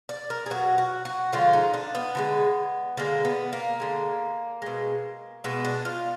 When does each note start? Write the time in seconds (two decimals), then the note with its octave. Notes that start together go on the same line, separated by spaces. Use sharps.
0.09 D5
0.30 A#4
0.46 G#4
0.50 B2 F#3 F#4
0.78 F#4
1.05 F#4
1.33 D3 F3 G#3 F4
1.53 D#4
1.74 D4
1.95 B3
2.15 D3 F3 G#3
2.97 D3 G#3 A#3
3.25 B3
3.53 A#3
3.80 D3 G#3
4.62 B2 G#3
5.44 B2 G#3 B3
5.65 D4
5.85 F4